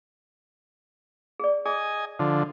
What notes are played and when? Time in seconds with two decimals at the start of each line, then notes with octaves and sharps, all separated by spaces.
1.39 G#4 D5
1.66 G#4 D#5 G#5
2.19 D3 F3